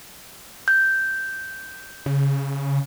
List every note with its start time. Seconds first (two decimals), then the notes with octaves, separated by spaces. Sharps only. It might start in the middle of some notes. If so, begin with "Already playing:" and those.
0.68 G6
2.06 C#3